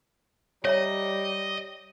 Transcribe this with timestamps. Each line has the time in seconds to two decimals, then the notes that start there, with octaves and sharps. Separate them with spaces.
0.65 G3 C#5 D#5 E5 A#5